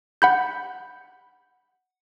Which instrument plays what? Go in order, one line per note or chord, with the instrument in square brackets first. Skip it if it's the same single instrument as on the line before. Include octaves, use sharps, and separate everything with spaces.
[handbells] F#5 B5 G6